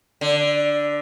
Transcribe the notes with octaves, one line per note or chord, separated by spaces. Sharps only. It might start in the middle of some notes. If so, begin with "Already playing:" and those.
D3